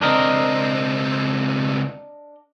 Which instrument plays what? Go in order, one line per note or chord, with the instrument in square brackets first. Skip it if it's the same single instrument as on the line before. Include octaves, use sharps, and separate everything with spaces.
[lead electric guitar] C#2 C4 [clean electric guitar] D4 A#4 D#5